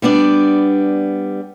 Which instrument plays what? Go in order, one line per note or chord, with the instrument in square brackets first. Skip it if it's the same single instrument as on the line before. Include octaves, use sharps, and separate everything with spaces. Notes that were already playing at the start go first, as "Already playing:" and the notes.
[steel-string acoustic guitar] G3 B3 D4 D5